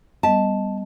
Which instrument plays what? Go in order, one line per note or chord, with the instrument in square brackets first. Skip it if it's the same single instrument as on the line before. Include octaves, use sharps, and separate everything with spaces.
[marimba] G3 B3 D#5 [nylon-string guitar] A5